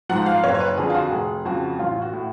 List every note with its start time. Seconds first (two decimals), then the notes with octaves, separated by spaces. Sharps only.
0.09 G#2 F3 F#5
0.26 F5
0.44 F#1 C#5
0.54 C#5
0.60 B4
0.78 F2 D3 G#4
0.90 F4
0.94 F#4
1.11 F1 G#4
1.45 F2 C#3 F3 F#4
1.79 A1 F4
2.02 F#4
2.13 A2